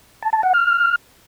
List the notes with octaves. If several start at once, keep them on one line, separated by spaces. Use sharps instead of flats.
A5
A5
F#5
F6